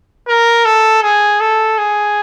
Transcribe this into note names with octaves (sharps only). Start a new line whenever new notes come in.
A#4
A4
G#4
A4
G#4